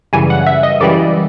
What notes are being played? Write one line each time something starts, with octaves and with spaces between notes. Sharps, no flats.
F#2 C#3 E3 G3 G#5
F#5
E5
D#5
F#2 C#3 E3 G3 D5